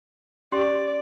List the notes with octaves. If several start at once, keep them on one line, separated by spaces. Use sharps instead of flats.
C#4 G4 D5 C6